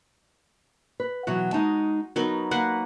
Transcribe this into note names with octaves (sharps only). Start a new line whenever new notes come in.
B4
B2 E3 F#3 F#4
G#3 D#4 A5
F#3 B3 D#4 A#4
A#3 B4 F#5